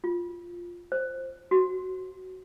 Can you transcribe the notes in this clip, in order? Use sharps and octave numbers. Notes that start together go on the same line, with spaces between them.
F4
C5
F#4